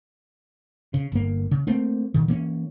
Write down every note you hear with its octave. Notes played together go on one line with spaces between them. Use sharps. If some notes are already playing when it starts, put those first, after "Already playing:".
C#3
G1 A#3
C#3
A3 A#3 C4
A#2 D#3
E3 A#3 B3 C#4